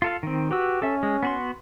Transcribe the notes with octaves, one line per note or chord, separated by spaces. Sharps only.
F4 A4 F5
D#3 C4
F#4 G4 B4 E6
C#4 A4 E5
G#3
B3 F#4 C6